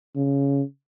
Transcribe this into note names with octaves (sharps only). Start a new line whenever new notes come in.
C#3